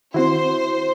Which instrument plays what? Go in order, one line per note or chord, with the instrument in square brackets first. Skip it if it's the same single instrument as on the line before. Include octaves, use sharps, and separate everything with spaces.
[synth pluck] D#3 C4 [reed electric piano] E4 F#4 [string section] C5